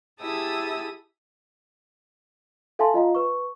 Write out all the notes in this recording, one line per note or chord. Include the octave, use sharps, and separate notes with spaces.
E4 G4 G#4 A5 D#6 E6
A4 E5 F5 G#5 A5 C6
F4 D#5 F5 A#5
B4 C#6